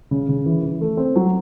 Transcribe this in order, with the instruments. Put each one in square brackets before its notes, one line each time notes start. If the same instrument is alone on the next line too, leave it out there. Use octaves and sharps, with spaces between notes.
[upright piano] C#3
C#3
E3
E3
A3
C4
F#3